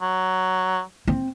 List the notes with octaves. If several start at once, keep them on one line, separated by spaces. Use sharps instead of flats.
F#3
C4